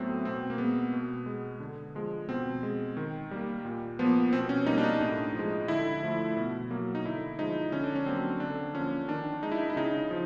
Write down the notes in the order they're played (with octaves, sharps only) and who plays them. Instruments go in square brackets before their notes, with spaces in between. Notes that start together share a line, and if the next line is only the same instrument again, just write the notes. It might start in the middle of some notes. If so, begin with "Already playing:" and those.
Already playing: [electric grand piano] A2 F#3 A3 B3 C4
B2 C4
A#3
G#3 B3
B2
G#3
D3
F3 G#3
B2 C4
G#3
D#3
G3 A#3
A#2
F3 A#3 B3
B2 C4
C#4
G3 A#3 D#4
D4
D#4
A2
F3 G#3
D3 E4
F3 A3
B2
F#3 A#3
D#4
D3 E4
F3 G#3 D#4
D3 C#4
D4
C#4
F#3 A#3 C4
D3 D4
F3 A#3 C#4
D#3 D4
G#3 D#4
E4
D#4
E4
C#3 D#4
F3